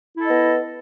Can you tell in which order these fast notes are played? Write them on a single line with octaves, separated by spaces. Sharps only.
E4 A4 D#5 B3